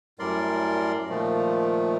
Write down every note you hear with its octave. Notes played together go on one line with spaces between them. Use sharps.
F#2 A2 G3 A#4 D5 C6
A#2 D#3 F3 A3